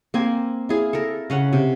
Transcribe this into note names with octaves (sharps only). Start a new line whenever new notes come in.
A#3 C4 G#5
E4 G#4 F5
A4 A#4
C#3 C#4 F#5
C3